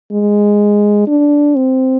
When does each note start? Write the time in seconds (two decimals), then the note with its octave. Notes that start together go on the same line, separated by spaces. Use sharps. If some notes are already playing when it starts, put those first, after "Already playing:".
0.12 G#3
1.07 D4
1.55 C4